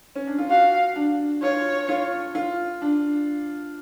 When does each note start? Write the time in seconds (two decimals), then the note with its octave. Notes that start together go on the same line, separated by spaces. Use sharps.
0.15 C#4
0.27 D4
0.38 F4
0.50 F#4 F5
0.96 D4
1.42 F4 C#5
1.89 F4
2.35 F4
2.82 D4